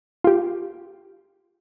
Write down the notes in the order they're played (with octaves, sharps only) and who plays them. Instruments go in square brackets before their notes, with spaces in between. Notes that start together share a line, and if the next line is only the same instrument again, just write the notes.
[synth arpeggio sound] F4 G4